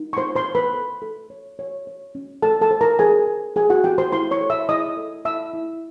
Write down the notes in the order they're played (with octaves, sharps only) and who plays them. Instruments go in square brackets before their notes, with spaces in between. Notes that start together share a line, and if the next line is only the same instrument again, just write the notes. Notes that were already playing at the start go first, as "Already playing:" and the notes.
Already playing: [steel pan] D#4
C#6
C5 C6
C5 C6
C5
B4 B5
A4
A4
C#5
C#5
C#5
C#4
A4 C5 A5
A4 A5
C5
A#4 A#5
G#4 C5 G#5
G#4
G#4 C5 G#5
F#4 F#5
G4 C5 G5
C5 C6
E4 C5 C6
C#5 C#6
A4
E5 E6
E4 D#5 D#6
A4
E4 E5 E6
E4